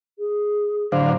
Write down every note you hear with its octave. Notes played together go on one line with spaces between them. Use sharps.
G#4
A2 D3 F#3 C5 F5